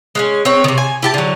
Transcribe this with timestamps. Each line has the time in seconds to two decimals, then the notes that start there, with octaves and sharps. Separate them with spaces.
0.15 G#3 C4 C#4
0.45 C4 B4 C#5 G5
0.64 C3 D#3
0.78 G#5
1.03 E4 G4 A5
1.14 D3 F#3